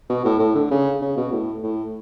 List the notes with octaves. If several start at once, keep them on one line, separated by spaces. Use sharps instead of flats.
B2
A2
A2
D3
C#3
C#3
B2
A2
A2